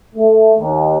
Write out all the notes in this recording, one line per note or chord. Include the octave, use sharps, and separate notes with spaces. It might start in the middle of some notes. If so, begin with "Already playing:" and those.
A3
D#2